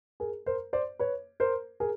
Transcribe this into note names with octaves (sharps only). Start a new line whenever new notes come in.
G#4 A#4
A#4 C5
C5 D5
B4 C#5
A#4 C5
G#4 A#4